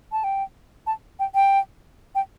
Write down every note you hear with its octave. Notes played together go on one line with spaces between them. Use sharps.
A5
G5
A5
G5
G5
G5